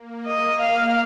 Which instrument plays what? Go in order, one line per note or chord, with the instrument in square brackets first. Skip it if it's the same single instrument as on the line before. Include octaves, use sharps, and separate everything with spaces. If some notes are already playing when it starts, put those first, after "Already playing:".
Already playing: [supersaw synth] A#3
[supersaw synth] A#3 [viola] D#5
[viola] F5